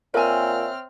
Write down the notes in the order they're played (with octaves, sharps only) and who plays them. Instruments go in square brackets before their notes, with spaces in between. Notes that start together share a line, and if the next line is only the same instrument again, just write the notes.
[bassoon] A#2 [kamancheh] C4 F6 [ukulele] A#4 G#5 [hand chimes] C#5 E5 E6